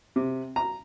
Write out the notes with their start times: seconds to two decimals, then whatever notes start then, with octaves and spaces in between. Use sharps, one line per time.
0.16 C3
0.56 A#5